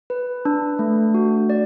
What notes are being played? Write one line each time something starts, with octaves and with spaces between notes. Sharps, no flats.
B4
D4
A3
F#4
D5